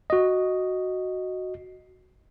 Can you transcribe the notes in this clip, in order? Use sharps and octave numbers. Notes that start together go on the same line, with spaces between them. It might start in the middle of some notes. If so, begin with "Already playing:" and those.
F#4 D#5